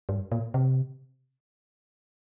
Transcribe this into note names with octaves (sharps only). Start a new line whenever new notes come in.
G2
A#2
C3